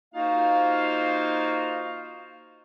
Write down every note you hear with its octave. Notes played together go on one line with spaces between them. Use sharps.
A#3 D#4 F4 F#4 C5 F5